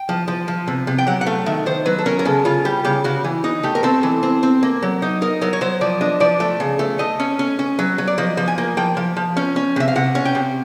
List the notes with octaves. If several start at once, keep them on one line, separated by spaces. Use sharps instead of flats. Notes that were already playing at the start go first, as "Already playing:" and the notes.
Already playing: G5
F3
F3
F3
C3
C3
G5
F#3 F#5
F#5
A3 F5
D#3 E5
D#3 C5
F#3 B4
A4
C#4 A#4
A#4
C#3 A4
C#3 F4
G3 G4
C#3 G4
C#3 F#4
E3
D#4
A3 G4
A#4
C4 A4
E3
C4
C4
A#3
F#3
D#4
D#4 A#4
F#3 A#4
C#5
F#3 C5
F3 D5
D4 D#5
F3 D5
A3
C#3
A3
A3 D#5
C#4
C#4
C#4
F#3
F#3
D5
F3 D#5
F3
G#5
A#3
F3 G5
F3
F3
C#4
C#4
C3 E5
F5
C3 F#5
C#4
G5
C3